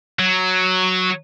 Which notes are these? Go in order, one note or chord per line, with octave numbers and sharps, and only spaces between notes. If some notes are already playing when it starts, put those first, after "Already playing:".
F#3